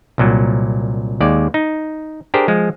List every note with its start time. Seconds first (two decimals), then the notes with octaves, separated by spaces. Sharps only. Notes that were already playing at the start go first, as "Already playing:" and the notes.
0.18 C2 A#2 F#3
1.21 D#2 G#3 D5
1.54 D#4
2.34 D4 G4 G#4 A#4 C5
2.48 F3 G#3